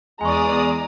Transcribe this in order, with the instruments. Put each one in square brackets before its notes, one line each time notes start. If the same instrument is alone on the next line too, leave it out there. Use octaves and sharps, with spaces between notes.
[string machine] E2 D5 D#6 [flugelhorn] G#3 [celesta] G#5 C#6 [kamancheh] A#5